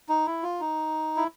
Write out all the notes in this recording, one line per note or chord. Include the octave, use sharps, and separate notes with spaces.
D#4
E4
F4
D#4
E4